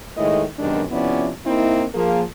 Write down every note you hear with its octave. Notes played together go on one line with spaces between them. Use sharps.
A2 D#3 G#3 A3 E4 D#5
F#2 B2 D#3 G3 G#3 D4
C3 F3 B3 C#4 E4 D5
A#3 C4 D#4 E4
F3 A#3 G#4